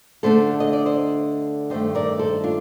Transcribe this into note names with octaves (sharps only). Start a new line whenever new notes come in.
D3 A3 D4 A4 C5
D#5
D5
C5 D#5
G2 D#3 A3 C5 D#5
A#4 D5
A4 C5
D4 F4